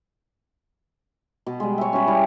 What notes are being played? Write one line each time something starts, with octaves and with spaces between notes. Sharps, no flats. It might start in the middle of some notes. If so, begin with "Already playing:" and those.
B2
G3 G#3
C#5 E5
C#4 F#4 C#5 B5
G3 C#4 E4 G4